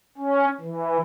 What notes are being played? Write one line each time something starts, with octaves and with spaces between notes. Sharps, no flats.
C#4
E3